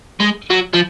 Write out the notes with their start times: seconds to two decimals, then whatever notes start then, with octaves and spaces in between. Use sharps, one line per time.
0.20 G#3
0.50 F#3
0.74 F3